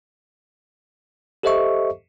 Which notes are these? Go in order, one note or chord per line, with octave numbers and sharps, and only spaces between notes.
G4 A4 C5 D#5 E5 C#6